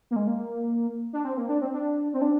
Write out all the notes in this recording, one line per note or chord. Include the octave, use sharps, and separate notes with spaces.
A#3
G#3
A#3
D4
C4
A#3
D4
C4
D4
C4
D4